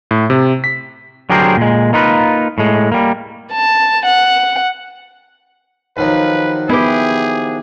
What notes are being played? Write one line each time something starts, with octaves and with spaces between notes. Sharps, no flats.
A2
C3
B6
D3 F#3 G4 G#4 A#4 C5
A#2 G#3
A#3 D#4 F4 B4
A2 G#3
G3 A#3
A5
F#5
D#2 F3 F#3 B4
B3 E4 G4 G#4 B4